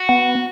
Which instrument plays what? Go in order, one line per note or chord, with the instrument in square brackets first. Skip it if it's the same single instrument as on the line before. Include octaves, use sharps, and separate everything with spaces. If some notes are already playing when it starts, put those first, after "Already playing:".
Already playing: [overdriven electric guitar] F#4
[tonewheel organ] B3